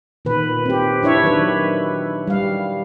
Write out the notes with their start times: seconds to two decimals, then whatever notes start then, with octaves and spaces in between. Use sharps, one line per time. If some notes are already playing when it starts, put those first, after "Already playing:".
0.25 A#2 D#3 B4
0.66 C4 G4
1.03 D4 E4 C#5 E5
1.23 D#3 F#3 B4
2.28 G3 F5